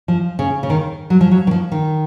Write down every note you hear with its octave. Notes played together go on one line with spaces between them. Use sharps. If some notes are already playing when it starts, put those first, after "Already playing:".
F3
C#3
C#3
D#3
F#3
F3
F#3
D#3
F3
D#3